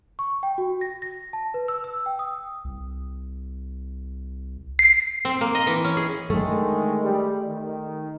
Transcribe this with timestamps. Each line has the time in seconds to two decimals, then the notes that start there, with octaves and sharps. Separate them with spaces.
0.19 C#6
0.43 G5
0.58 F#4
0.81 A#6
1.02 A#6
1.33 A5
1.54 B4
1.68 E6
1.84 E6
2.06 G5
2.19 D#6
2.64 C2
4.79 C7
5.25 C4
5.41 A#3
5.55 D#5
5.67 E3
5.84 C#4
5.97 G#4
6.30 D3 D#3 G#3 A3
7.03 G3
7.46 D#3